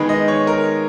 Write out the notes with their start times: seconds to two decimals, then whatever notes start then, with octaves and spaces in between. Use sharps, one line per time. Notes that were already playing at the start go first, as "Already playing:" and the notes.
Already playing: D#3 G#3 B3 D#4 B5
0.09 D#5
0.28 C#5
0.47 A#4